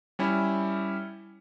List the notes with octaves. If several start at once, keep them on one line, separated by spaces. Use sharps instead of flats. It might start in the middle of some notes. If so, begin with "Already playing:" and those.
G3 C#4 E4